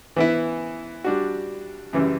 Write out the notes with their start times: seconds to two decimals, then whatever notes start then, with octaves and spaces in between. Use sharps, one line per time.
0.16 E3 B3 E4
1.04 G3 D4 F#4
1.93 F#2 C#3 E3 G3